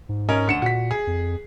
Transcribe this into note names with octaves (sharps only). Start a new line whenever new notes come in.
G#2
C#4 A#4 D#5
D2 C#7 E7
A#2 F#4 B6
G#4
F2